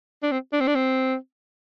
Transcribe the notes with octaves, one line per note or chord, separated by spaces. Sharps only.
D4
C4
D4
C4
D4
C4